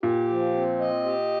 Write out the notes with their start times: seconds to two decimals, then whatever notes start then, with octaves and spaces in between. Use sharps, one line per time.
0.03 A#2 G4
0.29 F3
0.54 C4
0.79 D#5
1.04 G4